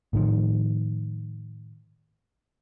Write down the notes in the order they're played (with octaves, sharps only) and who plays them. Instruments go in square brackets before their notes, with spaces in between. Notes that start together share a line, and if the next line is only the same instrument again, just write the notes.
[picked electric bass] A2 D#3 F3